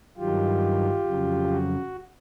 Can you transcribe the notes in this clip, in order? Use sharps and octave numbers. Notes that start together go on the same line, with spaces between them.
G2 D#3 F#3 F4 G4
F2 C#3 F#3
F#4